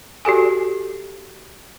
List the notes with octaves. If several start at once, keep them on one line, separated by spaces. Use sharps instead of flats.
F#4 G4 A4 G#5